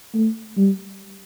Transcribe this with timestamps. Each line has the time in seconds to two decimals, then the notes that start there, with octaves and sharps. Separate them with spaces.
0.14 A3
0.57 G3